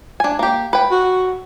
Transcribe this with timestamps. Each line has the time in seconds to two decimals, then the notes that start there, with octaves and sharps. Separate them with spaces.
0.20 D4 G#5
0.39 A#3 G4
0.73 B4 G5
0.91 F#4